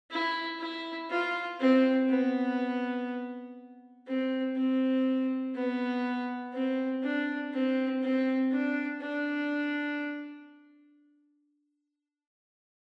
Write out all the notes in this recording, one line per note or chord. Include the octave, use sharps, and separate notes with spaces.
E4
E4
F4
C4
B3
C4
C4
B3
C4
D4
C4
C4
D4
D4